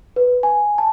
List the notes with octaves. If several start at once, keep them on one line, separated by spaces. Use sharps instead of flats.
B4
G#5
A5